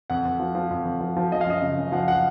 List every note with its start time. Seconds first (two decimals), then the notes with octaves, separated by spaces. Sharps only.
0.10 F2 F#5
0.25 F2
0.40 F3
0.55 F3
0.71 F2
0.85 F2
1.01 F3
1.17 F3
1.32 F3 D#5
1.41 F5
1.47 F#2 D#5
1.62 C#3
1.78 F#2
1.92 F3 F#5
2.08 F#5